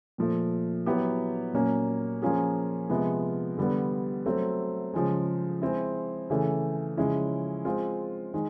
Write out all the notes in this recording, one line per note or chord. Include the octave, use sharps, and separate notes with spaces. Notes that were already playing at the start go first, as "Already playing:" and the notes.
A#2 F3 A3
F#3 B3 E4 G4
A#2 F#3 A#3 C#4
F3 A#3 C#4 F4 G#4
C3 F3 G#3 B3
D3 G3 B3
F#3 A3 C4
C#3 F3 G#3
G#3 C4 E4
C#3 E3 A3
C#3 F3 G#3 C#4 E4
G#3 C4 F4
D#3 G#3